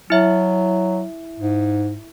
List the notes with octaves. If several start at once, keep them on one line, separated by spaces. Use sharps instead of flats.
F#3 E4 E5
G#2